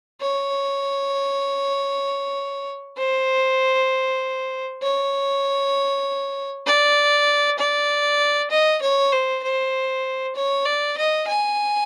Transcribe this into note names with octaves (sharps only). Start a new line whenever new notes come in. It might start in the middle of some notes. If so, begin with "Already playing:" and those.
C#5
C5
C#5
D5
D5
D#5
C#5
C5
C5
C#5
D5
D#5
G#5